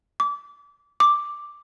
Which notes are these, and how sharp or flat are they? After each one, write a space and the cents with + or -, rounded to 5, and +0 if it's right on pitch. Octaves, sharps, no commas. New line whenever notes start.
D6 -25
D6 +0